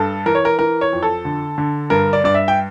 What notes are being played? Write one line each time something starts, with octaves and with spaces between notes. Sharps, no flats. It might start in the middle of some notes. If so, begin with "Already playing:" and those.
Already playing: G2 A4
E3 A#4
C#5
A#4
E3 A#4
C#5
F2
A4
D3
D3
G2 A#4
D5
G2 D5
E5
G5